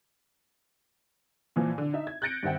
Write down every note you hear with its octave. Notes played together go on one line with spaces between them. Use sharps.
A#2 E3 F3
D3
D#4 E5
G#6
F#6 G6 A6 A#6 C#7 D7
G2 D#3 C4 E5 F#5 G5